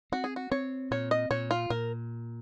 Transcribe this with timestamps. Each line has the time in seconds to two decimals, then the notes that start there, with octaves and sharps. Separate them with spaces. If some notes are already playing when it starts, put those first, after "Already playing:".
0.12 C4 F#4
0.24 G#4
0.36 F#4
0.51 C4 C#5
0.91 A#2 C#5
1.11 D#5
1.30 A#2 C#5
1.51 F4
1.70 A#2 A#4